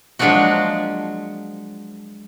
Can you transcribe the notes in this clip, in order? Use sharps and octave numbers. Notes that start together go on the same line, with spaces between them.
F3 F#3 G#3 A#3 D4 F#4